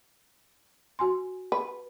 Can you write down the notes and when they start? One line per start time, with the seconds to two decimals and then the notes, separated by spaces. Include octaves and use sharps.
0.99 F#4 G#5 C6
1.52 B4